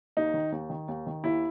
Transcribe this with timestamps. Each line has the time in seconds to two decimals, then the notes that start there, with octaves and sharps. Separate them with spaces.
0.17 D#2 D#4
0.34 D#3
0.52 D#2
0.70 D#3
0.88 D#2
1.06 D#3
1.24 D#2 E4